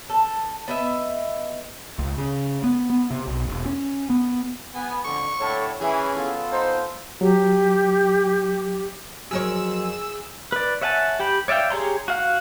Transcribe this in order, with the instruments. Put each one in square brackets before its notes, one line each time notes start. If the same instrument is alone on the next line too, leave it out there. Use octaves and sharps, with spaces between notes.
[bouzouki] A4
B3 D#5 E5
[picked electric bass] C#2
C#3
B3
B3
C3
B1
E1
C#4
B3
[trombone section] B3 [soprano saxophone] G#5
[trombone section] F2 D3 [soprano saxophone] C#6
[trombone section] A2 D3 A4 [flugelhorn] C#5
[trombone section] E3 [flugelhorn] C#4 [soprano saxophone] G#4
[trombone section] B3 F4 A4
[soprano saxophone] D#4 [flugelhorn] C5
[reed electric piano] F#3 [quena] G4
[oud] F2 A#4 C#5 [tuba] F#3 [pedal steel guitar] G#4 [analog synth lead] E6
[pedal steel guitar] B4 D5
C#5 E5 F#5 G#5 A5
G4 G5 B5
C#5 D5 E5 F5 G5
G4 G#4 C#5 A#5 C6
F#4 F5 F#5